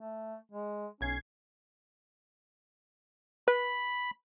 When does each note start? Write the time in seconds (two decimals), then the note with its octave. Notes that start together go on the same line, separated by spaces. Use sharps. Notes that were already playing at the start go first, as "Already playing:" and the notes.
0.01 A3
0.52 G#3
1.01 B1 C#4 G#6 C7
3.48 B4 B5